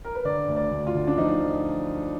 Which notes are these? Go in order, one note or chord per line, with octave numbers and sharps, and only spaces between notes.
A#4
B4
D3 D5
D2
D5
D2
F4
D3
D4
F3 D#4